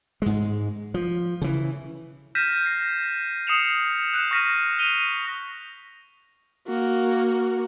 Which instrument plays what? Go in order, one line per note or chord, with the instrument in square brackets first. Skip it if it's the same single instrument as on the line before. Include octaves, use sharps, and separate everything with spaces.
[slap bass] G#2 G#3
F3
C#3 E3
[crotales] F6 G6 A#6 B6 D#7 E7
A#6 C7
D#6 C7 C#7 E7 F7
F#6 C#7 E7
C#6 F6 A#6 B6 D#7
C7 D#7 F7 G7
[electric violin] A#3 F#4